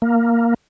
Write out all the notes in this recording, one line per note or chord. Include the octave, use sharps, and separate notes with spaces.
A#3